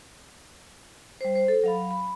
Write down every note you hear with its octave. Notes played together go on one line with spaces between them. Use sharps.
G3 C5
C5
A4
F#3 F5 B5
B5